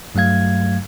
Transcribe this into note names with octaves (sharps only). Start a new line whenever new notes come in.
G2 F#3 A3 F5 G#6